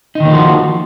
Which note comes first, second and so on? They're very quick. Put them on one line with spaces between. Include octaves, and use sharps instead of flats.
D#4 D#3 A#3 F3 F#4